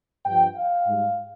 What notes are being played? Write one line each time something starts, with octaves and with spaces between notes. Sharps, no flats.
G2 F3 G5
F5
G#2 G3